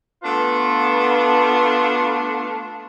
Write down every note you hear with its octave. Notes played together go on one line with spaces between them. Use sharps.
A3 B3 D4 F4 B4